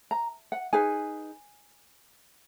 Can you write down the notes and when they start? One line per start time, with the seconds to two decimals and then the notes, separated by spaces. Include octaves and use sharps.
0.11 A#5
0.52 F#5
0.73 D#4 G#4 B4 G#5